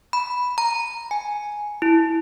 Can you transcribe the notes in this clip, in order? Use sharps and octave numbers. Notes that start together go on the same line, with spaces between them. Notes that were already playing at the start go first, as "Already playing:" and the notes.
B5
A#5
G#5
E4